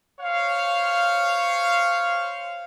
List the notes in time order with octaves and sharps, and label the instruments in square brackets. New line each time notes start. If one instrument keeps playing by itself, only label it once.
[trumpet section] C5 C#5 F5